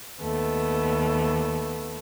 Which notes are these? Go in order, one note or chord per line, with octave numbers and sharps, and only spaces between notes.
D#2 A3 B3